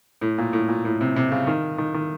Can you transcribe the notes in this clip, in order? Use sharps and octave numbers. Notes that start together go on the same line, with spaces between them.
A2
A#2
A2
A#2
A2
C3
C3
C#3
D#3
D#3
D#3